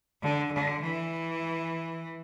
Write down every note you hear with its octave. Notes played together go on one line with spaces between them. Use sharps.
D3
D3
E3